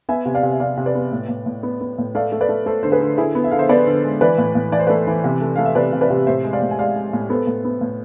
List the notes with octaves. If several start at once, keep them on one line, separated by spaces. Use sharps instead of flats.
B3 E5 G#5
C3
D5 F5
C3
E5
C3 D5 F5
C3
B4 D5
B3
A2
A2
A2
B3
B3
A2
A3 D5 F5
A3
B4 D5
A3
A3 A4 C5
D3 C5
G#4 B4
D3
D3 E4 G#4
B3
E5
D3 F5
C5 E5
B3 B4 D5
D3
G#3
E3 B4 D5
A2
A2
E3 D5
C5
A3 B4 D5
E3
C3
A3
A3 F5
E5
C3 B4 D5
C3
B4 D5
C3
A2 C5 E5
G#3
D5 F5
A2
G#5
G#3 D5 F5
G#3
A2
B3 A4 C5
A2
B3
A2